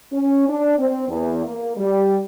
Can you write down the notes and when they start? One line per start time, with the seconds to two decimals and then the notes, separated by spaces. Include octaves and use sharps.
0.12 C#4
0.48 D4
0.79 C4
1.09 E2
1.46 A#3
1.77 G3